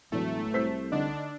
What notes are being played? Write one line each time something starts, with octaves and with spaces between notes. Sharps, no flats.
E1 A2 E3 F#3 A3
C2 C5 E6 B6
D3 D4 D#4